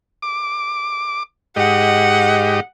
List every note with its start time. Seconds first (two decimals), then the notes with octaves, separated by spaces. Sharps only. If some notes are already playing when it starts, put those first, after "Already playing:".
0.22 D6
1.56 G#2 G4 D#5 F#5